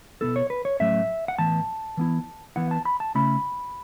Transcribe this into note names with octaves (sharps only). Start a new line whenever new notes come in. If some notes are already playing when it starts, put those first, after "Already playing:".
B2 B3 E4 A4
C#5
B4
C#5
A2 F#3 A3 C#4 E5
F#5
A2 E3 B3 A5
E3 B3 E4
E3 B3 E4 F#5
A5
B5
A5
C#3 A3 C#4 E4 B5